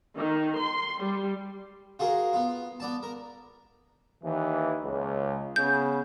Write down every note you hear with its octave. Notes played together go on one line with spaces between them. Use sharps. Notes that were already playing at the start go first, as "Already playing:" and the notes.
D#3
C6
G3
F4 F#4 G#4 A#4
B3 F4
B3 D5 A5
A#4
D#2 E3
C#2
C#3 B3 G6